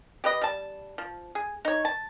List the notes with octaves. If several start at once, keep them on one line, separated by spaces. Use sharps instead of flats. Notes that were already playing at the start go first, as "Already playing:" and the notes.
G4 B4 D#5
G3 A5
F3
G#4
D#4 C#5
A5